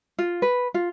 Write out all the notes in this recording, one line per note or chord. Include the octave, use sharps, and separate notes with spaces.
F4
B4
F4